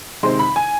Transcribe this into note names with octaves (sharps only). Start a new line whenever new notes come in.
C3 D#3 G#3 C4 C6
B5
G#5